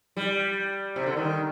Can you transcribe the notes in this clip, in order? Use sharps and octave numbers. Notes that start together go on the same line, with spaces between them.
G3
C3
D3
D#3